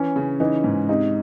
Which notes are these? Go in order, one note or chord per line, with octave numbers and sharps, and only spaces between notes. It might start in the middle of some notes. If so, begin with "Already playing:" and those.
Already playing: E3 C#4
C#3
E3 D#4
G#2
C3 D#4